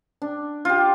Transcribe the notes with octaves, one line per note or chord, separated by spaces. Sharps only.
D4
F4 G4